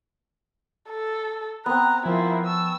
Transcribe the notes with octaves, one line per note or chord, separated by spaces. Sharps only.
A4
B3 C4 A#5 F#6
F3 E4 F4 A#4 C5 G#5
A5 C#6 E6